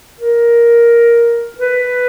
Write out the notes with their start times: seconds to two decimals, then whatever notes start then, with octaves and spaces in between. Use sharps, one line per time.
0.20 A#4
1.58 B4